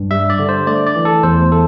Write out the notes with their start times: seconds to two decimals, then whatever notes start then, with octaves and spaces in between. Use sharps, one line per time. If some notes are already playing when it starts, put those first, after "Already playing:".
Already playing: G2
0.11 G3 E5
0.30 D5
0.39 D3
0.49 C5
0.67 A3 D5
0.86 D5
0.96 E3
1.05 A4
1.23 E2 C5
1.52 A3 A4